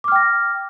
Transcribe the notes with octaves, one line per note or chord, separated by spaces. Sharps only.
G5 D6 F6 A#6